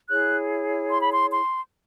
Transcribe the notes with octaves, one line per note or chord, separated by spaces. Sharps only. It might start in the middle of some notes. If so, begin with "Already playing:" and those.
E4 G#4 C#5 F#6
C6
B5
C6
C6